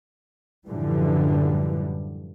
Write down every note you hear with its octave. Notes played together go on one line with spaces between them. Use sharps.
F#2 A2 D3 E3 F3 G3